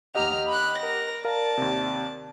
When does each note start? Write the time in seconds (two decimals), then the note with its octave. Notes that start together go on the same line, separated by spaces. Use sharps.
0.15 D#2 G4 D#5 F#5 A#5 F6
0.48 B5 F#6
0.78 A#4 A#6
1.25 A#4 D5 F5 A5 A#5
1.58 D#2 C3